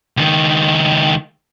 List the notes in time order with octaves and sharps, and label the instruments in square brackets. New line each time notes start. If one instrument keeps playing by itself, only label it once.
[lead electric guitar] C#2 D#3